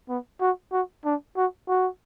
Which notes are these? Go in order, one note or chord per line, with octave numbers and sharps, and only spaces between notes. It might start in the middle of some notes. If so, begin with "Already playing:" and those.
B3
F#4
F#4
D4
F#4
F#4